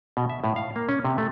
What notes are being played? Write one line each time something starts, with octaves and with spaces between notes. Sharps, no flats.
B2
E5
A2
F5
A#3
C#4
C3
A3